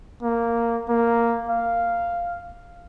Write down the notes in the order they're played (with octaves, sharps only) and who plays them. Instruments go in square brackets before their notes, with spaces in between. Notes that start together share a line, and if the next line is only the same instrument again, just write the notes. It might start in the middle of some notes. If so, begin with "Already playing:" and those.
[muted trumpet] A#3
A#3
F5